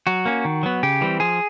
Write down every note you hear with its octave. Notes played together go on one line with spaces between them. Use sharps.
F#3 F#4
A#3 C#4
D#3
F#3 B3
C#3 G4
E3 G3 C4
F3 G#4